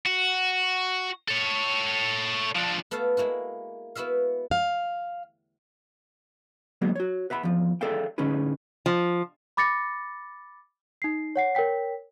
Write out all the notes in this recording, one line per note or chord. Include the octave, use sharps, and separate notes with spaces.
F#4
A4 C#5
F3 D4
A3 B3 F#4 E5 F5 A5
G#3 A#3 E4 F#4
B3 E4 F#4 E5 F5
F5
D3 F#3 G#3 A#3 B3
F#4 C#5
B4 E5 F#5 B5
E2 F3
G#4 A4 D5 E5 F5 G5
A2 D3 C#4 D#4 G#4 B4
F3
B5 D6 A6 A#6 C#7
D#4 C7
C#5 F#5 C7
A#4 C#5 G5 B6